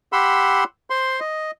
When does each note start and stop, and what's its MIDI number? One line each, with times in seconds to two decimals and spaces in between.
0.13 0.64 67
0.13 0.64 78
0.13 0.64 83
0.13 0.64 84
0.13 0.64 88
0.90 1.20 72
0.90 1.20 84
1.20 1.51 75